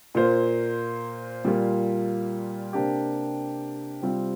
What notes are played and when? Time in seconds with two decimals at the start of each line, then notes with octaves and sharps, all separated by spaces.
0.14 A#2 A#3 F4 C5
1.44 A#2 G3 A#3 F4
2.73 C3 A#3 D4 G4
4.02 C3 G3 C4 F4